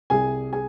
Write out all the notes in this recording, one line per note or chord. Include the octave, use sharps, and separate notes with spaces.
C2 C3 G3 G#4 G#5
G#4 G#5